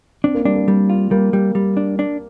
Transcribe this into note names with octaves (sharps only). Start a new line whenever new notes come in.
C4 D4
A#3
G3 D4
A#3
G3 A#3
F4
G3 A#3
G3
G3
D4
D4